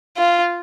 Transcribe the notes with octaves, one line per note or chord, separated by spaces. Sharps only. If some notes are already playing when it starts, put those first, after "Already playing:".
F4